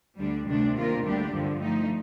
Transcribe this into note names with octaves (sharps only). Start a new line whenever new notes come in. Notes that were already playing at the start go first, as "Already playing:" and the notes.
D2 D3 G3 D4
D2 C3 D#3 A3 D4
C3 D#3 A#3 F4 A#4
D2 D3 G3 D4 G4
G2 D3 F3
F3 A3 D#4